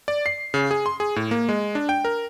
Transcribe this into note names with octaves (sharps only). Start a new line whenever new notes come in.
D5
C7
C#3
G#4
C6
G#4
A2
A#3
G#3
D4
G5
A#4